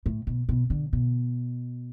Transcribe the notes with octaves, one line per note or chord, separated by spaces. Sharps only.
A2
B2
B2
D3
B2